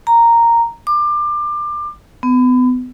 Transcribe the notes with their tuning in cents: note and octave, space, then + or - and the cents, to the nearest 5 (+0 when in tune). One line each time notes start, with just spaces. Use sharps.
A#5 -5
D6 +25
B3 +30